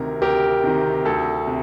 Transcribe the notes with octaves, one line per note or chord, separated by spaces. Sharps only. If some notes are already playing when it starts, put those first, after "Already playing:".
Already playing: D2 C3 D#3 A#4
D2 G4 A#4
C3 D#3
D2 A4
C3